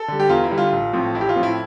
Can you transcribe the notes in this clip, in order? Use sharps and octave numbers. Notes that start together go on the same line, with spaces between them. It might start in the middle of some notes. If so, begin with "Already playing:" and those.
Already playing: A4
D3 G3
G4
E2 F4
E4
D3 G3
F4
A1
A2 F3 C4
A1 E4
G4
F4
A2 F3 C4
E4